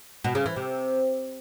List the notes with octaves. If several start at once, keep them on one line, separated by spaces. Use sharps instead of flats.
B2
C#3
E3
C3